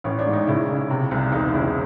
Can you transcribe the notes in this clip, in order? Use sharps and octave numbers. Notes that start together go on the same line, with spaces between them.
A1 C#4
D4
G#2
D#4
C#3 E4
C#3
C3
C2
E1 D#4
C#3 E4